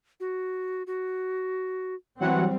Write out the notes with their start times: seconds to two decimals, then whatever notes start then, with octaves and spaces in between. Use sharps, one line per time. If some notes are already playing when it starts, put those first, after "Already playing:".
0.20 F#4
0.87 F#4
2.20 E3 F#3 G3 C4 F#5